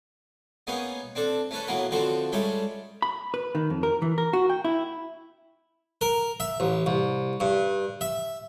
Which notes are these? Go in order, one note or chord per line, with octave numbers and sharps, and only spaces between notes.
A#3 B3 C#4 D#4 G#4
C4 D4 A4
A3 C#4 A4 B4
A2 F#3 A#3 B3 A#4
D3 F3 C4 F#4 A4
G3 G#3 C#4 G4 A4 E5
B5
B4
D#3
F2
A#4
E3
A#4
F#4
G5
E4
A#4
E5
A1
C2
G2
E5